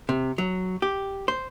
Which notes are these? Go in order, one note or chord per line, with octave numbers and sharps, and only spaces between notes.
C3
F#3
G4
C5